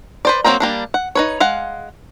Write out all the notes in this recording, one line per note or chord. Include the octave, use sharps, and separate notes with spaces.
B4 C5 D5
F#3 A#3 C4 G5 A#5
G3 A#3 D4
F#5
D#4 B4 C#5
G#3 F5 F#5